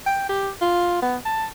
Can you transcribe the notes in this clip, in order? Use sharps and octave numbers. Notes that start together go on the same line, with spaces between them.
G5
G4
F4
B3
A5